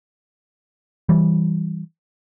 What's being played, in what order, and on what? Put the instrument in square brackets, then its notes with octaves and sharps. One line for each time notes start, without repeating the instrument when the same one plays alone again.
[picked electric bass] E3 G3